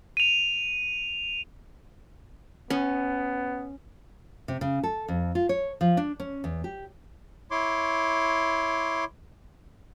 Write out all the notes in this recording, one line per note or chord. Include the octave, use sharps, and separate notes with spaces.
D#7 F7
B3 C#4
C3
C#3
A4
F2
F4
C#5
F3
D4
C#4
E2
G4
E4 C#5 C6 D6